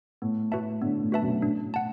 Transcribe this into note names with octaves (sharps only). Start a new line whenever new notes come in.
A2 B3
A2 F#4 B4 E5 A5
A2 D3 B3
A2 D3
F#4 B4 E5 A5
F#2 B2
A2 D4
A2
F#5 A5